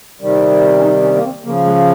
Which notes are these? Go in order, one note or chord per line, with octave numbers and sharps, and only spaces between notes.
C3 D#3 G3
C#4
D#4
C#4
A#3
C4
C#3 F3 A#3
G#3